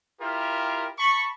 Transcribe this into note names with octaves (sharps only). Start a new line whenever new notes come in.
E4 F4 G4 A#4
A5 B5 C#6